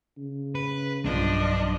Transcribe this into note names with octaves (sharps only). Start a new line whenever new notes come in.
C#3
B4
B1 G2 F3 D4 D#5